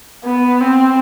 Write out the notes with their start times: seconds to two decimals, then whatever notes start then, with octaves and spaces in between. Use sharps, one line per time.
0.25 B3
0.61 C4